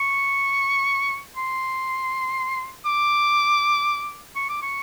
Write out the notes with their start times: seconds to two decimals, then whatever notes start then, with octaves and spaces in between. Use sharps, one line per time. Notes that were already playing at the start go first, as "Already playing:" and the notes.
Already playing: C#6
1.37 C6
2.86 D6
4.36 C#6
4.49 D6
4.62 C#6